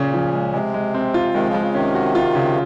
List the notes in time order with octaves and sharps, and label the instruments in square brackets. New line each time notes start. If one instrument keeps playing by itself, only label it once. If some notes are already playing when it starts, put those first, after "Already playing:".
Already playing: [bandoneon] A#2 [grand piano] C#3 C#4
[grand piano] F3
G#3
[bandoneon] C3 [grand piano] G#3
[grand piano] G#3
C4
F4
[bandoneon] C3 D#3 [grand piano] G#3
[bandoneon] C#3 F3
[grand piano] G#3
[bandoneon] C#3
[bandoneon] C3 D#3 [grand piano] C#4
[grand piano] F#4
F4
C#3